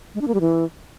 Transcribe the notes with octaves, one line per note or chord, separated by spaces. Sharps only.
G#3
D4
A#3
G3
E3